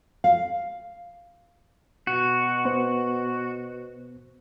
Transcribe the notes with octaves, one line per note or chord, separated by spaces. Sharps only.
F5
B2 F#4
B3 C5